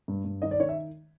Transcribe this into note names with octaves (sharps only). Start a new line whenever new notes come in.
G2
G2
D#3 D#5
D5
D#3 C#5
E5